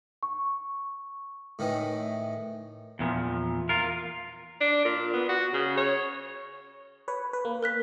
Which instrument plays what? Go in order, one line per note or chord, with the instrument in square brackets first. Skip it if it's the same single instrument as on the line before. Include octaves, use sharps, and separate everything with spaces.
[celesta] C#6
[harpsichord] A2 D#3 E3
[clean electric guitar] E2 A#2 D#3 F3
F4 A#4
[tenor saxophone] D4
A#2
B3
F#4
C#3
C#5
[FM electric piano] B4 C#5
B4
A#3
[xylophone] A#4 F#6 B6